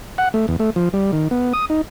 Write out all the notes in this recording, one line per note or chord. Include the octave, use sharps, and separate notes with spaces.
F#5
A3
E2
A3
F3
G3
D#3
B3
D#6
D#4